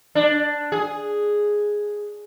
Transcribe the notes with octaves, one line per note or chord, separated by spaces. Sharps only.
D4
G#4